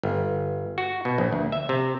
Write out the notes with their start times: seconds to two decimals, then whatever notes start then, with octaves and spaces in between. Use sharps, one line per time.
0.03 G1
0.78 F#4
1.05 B2
1.18 A#1
1.33 D2
1.52 E5
1.69 C3